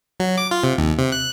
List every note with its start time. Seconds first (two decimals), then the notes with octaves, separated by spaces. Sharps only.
0.20 F#3
0.38 D6
0.51 F4
0.64 C3
0.78 D#2
0.99 C3
1.12 F#6